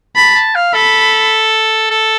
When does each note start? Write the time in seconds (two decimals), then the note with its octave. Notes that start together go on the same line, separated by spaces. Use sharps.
0.16 A5 B5
0.35 A5
0.55 F5
0.74 A4 B5
1.90 A4